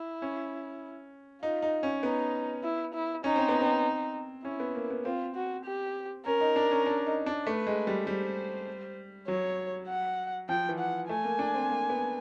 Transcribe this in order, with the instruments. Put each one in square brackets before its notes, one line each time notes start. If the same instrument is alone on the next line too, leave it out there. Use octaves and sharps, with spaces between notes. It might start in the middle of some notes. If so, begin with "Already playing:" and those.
Already playing: [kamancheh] E4
[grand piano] C#4
[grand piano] D#4 [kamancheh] F4
[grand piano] D#4
C#4
[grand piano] B3 [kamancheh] D#4
[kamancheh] E4
E4
[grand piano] C#4 [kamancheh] D#4
[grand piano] C4
B3
C4
[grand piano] C#4 [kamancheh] E4
[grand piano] B3
A#3
B3
[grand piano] C4 [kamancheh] F4
[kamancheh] F#4
G4
[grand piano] C#4 [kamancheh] A#4
[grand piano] D#4
D4
C#4
D4
D#4
D4
[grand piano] A3 [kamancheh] B4
[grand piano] G#3
G3
[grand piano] G3 [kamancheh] C5
[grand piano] F#3 [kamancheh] C#5
[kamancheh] F#5
[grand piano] F3 [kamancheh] G5
[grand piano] E3
[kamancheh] F#5
[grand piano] A3 [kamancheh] G#5
[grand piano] A#3
D4
C4
A#3
B3